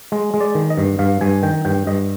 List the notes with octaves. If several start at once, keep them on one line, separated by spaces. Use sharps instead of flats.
G#3
G#3
D5
D#3
D#5
G2
G2 F5
G2 G#5
D#3 G5
G2 G5
G2 D#5